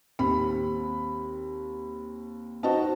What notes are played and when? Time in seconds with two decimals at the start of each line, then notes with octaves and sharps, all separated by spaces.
0.19 D#2 C4 B5
2.63 D#4 F#4 C5 D#5 A5